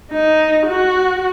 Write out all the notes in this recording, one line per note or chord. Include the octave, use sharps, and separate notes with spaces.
D#4
F#4